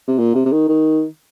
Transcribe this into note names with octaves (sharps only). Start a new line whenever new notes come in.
C3
A#2
C3
C3
D#3
D#3